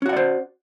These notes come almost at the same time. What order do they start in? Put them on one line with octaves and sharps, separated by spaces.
C#4 F#4 F#5 D5 C5